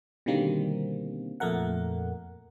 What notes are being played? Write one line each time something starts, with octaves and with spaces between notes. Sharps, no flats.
B2 D3 D#3 G3 A#3 C4
F2 A#2 A3 A#4 F#5